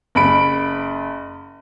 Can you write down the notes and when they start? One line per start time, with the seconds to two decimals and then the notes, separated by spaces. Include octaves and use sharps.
0.15 F#1 B5 D7